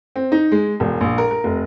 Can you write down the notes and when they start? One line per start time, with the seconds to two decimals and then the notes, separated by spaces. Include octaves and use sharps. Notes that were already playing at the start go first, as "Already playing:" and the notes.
0.16 C4
0.32 D#4
0.52 G#3
0.80 E1
1.01 A#1
1.18 A#4
1.31 A#4
1.44 F1